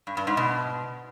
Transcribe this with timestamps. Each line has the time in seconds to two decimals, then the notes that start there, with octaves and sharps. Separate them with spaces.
0.07 G2
0.17 G2
0.27 G#2
0.37 B2